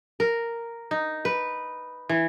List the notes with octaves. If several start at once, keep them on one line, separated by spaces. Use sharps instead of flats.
A#4
D#4
B4
E3